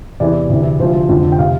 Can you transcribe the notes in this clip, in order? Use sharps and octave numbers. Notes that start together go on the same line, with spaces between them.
E2 C3 E3 D5
D2 C3 E3
D2 C3 F3 C5
F1 F2 D3
G5
C3 F5